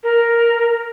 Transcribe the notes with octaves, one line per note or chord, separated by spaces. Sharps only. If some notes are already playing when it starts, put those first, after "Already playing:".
A#4